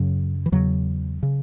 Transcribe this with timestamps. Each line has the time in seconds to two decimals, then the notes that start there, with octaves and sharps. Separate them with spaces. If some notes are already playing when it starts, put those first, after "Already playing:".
Already playing: F#2 C#3 F#3
0.46 E3
0.52 E2 C#3 F#3
1.23 C#3